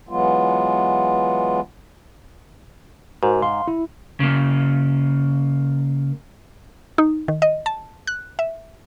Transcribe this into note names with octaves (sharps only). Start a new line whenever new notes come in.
E3 F#3 G#3 B3 F4
G#2 F#4 A#4 C5
F5 C6
E4
C#3 A#3
D#4
D#3
D#5
A5
F#6
E5